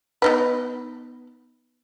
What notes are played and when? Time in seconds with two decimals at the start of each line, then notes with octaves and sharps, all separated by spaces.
0.22 B3 D#4 B4